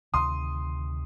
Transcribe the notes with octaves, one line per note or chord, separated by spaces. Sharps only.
D2 C3 D#3 C6 D#6